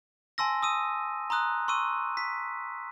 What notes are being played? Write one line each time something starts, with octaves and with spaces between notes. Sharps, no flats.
G#5 A5 C6 E6 A#6
D#6 E6 D#7
A#5 C6 D#6 F#6
C6 C#6 E6 D#7
B6